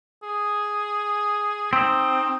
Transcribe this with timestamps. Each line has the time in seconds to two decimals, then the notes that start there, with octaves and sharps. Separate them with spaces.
0.23 G#4
1.73 C4 D#4